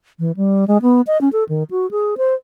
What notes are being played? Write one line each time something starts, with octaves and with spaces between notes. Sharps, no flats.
E3
G3
G#3
B3
D#5
C#4
A4
D#3
F#4
G#4
C5